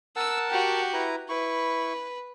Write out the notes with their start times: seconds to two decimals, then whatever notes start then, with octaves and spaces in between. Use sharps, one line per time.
0.16 A#4 F#5 A5 E6
0.50 F#4 G4
0.94 E4 B4 A#5
1.29 E4 B4 C#6